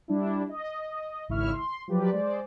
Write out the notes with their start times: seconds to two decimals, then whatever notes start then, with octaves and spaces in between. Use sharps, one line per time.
0.08 G3 D4 E4
0.49 D#5
1.28 G#1 C#2 E4 E5 C#6 F6
1.53 C6
1.88 F3 F#3 G4 B4 D5
2.12 G#3 C5 D5